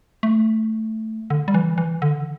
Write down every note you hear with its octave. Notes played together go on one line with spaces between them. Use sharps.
A3
D3
G3
E3
E3
D3